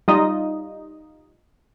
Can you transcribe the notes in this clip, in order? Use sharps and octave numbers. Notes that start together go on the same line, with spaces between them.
G3 D#4 F4 D#5